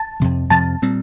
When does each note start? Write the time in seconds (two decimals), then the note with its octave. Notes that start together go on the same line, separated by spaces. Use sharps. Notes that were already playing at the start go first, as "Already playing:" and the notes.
Already playing: A5
0.20 F2 C3 F3
0.50 F2 C3 F3 A5
0.82 A#2 G3 C4